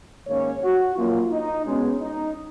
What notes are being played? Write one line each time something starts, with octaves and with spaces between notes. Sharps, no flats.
G#2 D#3 A#3 C#4 C#5
F#4
F#2 F3 A#3 F4
D#4
B2 G#3 B3 C#4
D#4